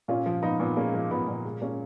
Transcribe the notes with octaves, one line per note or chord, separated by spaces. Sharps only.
A#2 C#4 F4
F3
F3 B3 D#4
A#2 B3
G#3 A#3 C#4
F3
A#2 B3
A#2 B3
G#3
G#3 A#3 C#4